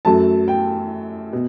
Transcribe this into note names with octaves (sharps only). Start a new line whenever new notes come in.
F#2 F#3 A3 A5
G5
B2